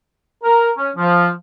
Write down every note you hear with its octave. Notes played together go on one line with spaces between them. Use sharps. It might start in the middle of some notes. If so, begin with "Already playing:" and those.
A#4
C#4
F3